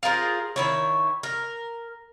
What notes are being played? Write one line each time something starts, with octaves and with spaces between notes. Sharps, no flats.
F4 G#4 A#4 C5
D#3 E4 C#5
A#4